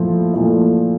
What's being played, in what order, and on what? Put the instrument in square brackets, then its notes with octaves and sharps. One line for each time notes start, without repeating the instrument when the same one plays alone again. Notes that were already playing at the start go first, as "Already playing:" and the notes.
Already playing: [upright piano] A#2 F3 A3 E4
A#2 F3 A3 E4